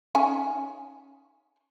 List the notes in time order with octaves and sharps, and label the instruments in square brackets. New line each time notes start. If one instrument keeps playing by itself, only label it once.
[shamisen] C#4 D#4 G#5